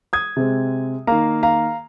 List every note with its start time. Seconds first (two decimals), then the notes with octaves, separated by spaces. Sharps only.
0.13 D#6 G#6
0.37 C3 G#3 C4
1.07 D#3 A#3 F5 A#5
1.43 F5 A#5